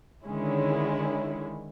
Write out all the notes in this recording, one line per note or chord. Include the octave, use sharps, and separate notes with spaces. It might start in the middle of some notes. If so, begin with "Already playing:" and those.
D3 D#3 G#3 C#4 E4